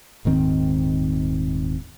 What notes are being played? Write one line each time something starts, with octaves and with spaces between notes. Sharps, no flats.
D#1 G#2 D#3 C4